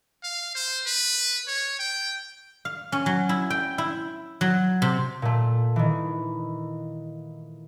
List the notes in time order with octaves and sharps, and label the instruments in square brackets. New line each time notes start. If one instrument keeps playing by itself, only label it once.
[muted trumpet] F5
C5
B4
C#5
G5
[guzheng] F5
C#4
F#3
E4
G5
E4
F#3
C3
[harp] A#2 A3
D#3 E3